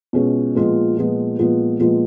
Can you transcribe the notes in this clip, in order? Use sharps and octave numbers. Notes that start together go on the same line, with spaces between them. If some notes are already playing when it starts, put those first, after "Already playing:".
B2 G#3 C#4 F4 G#4
A#2 F3 G#3 B3 F4
A#2 F3 G#3 B3 F4
A#2 F3 G#3 B3 F4
A#2 F3 G#3 B3 F4